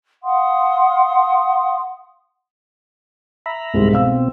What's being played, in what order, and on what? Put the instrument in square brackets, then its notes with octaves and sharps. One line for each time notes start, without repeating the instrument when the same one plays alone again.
[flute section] F5 F#5 C6 D#6
[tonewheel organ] E5 A#5 B5
[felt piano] C2 G#2 G#3
[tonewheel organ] B2 C4 [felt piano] F5 E6